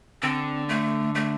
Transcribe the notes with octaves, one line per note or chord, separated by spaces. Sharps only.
D3 C4
A3
A3